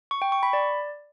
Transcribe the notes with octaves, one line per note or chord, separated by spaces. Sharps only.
C#6
G5
C#6
B5
D5